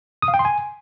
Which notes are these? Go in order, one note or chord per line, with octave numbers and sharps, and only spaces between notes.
D#6
F5
G5
C6
G#5